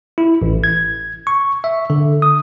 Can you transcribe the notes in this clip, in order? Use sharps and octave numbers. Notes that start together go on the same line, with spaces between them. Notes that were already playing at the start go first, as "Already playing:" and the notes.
E4
A1
G#6
C#6
E5
D3
D#6